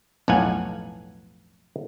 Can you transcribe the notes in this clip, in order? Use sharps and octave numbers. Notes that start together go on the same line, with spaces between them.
B1 F2 A2 F5 F#5 G#5